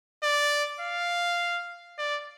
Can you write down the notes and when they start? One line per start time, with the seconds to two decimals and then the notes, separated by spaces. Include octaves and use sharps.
0.23 D5
0.80 F5
1.98 D5